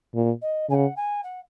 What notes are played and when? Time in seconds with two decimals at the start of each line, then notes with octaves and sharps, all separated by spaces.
0.15 A#2
0.42 D#5
0.69 C#3 G#5
0.74 F#5
0.96 G#5
1.23 F#5